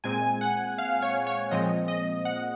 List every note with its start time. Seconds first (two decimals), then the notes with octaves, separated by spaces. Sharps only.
0.04 A#2 G#3 C4 G#5
0.41 F#5
0.78 F5
1.02 C#5
1.27 C#5
1.51 A#2 F3 G#3 C4 D#5
1.88 D#5
2.25 F#5